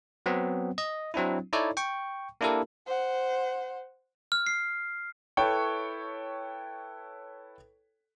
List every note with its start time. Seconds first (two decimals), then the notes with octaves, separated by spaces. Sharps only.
0.26 F#3 B3 C4
0.78 D#5
1.14 F#3 C4 D4 E4
1.53 D#4 E4 A4 C#5 D5
1.77 G5 C#6
2.41 A#3 D4 E4 G4 A4 A#4
2.87 C5 F#5
4.32 F6
4.47 C7
5.37 E4 A4 B4 C#5 G5 C#6